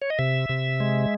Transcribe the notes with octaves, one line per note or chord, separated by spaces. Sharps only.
C#5
D#5
C3 E5
C3
G#3